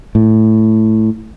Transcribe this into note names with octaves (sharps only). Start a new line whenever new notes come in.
A2